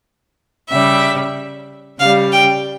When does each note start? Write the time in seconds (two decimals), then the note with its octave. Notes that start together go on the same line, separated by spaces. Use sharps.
0.71 C#3 G3 E5
1.99 C#3 G3 F5
2.32 G5